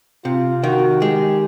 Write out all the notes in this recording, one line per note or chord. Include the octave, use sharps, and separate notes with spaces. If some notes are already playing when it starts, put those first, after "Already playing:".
C3 F4
D#3 F#4
G#3 G4